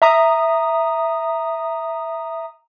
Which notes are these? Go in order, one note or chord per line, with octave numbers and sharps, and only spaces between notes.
E5 A#5 D#6